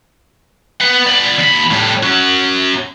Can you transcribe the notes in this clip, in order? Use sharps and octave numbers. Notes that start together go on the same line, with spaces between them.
B4 F#5
B3 D5
D#2 B5
A2 G3
C#4 F#4